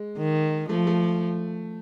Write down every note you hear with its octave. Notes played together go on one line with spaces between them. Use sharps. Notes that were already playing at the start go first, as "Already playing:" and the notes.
Already playing: G#3
D#3
F3 A3
A3